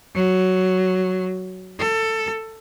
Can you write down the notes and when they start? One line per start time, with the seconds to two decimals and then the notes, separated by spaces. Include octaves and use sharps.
0.15 F#3
1.79 A4